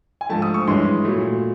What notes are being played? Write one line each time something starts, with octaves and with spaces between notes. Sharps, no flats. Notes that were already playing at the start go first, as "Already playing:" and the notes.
G#5
G#2 F3 A3 A5
D#6
C#6
G2 E3 G#3 C#4 C6
A#2 F#3 A3